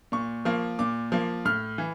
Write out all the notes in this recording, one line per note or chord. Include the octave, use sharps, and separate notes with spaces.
A#2 C#6
F3 A#3
A#2 D6
F3 A#3
A2 F6
E3